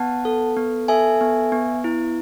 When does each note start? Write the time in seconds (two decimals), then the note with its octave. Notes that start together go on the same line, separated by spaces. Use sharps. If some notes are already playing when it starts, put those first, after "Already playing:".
Already playing: B3 F#5 A5
0.25 A4
0.57 B3
0.88 A4 E5 G#5
1.21 B3
1.52 B3
1.84 E4